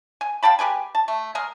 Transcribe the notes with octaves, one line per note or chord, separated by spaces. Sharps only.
G#5
F5 G5 A5 B5
G#3 G4 B4 G#5
A5
A3
G#3 G#4 A#4